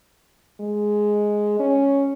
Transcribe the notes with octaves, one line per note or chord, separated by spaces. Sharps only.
G#3
C#4